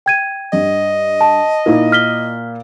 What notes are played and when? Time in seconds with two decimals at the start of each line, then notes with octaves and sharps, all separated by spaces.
0.06 G5 G#6 D#7
0.53 G2 D#5
1.21 A5
1.66 A#2 D#4 E4 A#4
1.92 F6 B6 G7